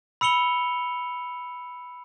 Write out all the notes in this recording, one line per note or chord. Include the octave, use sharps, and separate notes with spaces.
B5 E6 C#7 F7 G7